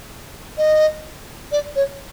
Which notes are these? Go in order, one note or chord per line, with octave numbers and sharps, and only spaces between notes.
D#5
D5
C#5